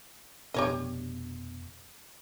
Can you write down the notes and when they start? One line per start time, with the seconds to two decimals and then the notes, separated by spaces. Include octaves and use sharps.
0.54 F1 B2 D4 G4 C#5 D#5